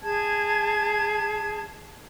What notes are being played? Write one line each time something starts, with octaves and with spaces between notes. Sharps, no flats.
G#4 A5 G#6